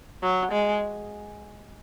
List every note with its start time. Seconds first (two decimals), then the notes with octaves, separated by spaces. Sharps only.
0.22 F#3
0.52 G#3